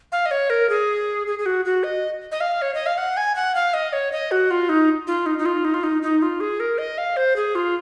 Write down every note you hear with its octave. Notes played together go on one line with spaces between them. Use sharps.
F5
D#5
C#5
A#4
G#4
G#4
G#4
F#4
F#4
D#5
D#5
F5
C#5
D#5
F5
F#5
G#5
F#5
F5
D#5
C#5
D#5
F#4
F4
D#4
F4
D#4
D#4
F4
D#4
F4
D#4
D#4
F4
G#4
A#4
D#5
F5
C5
G#4
F4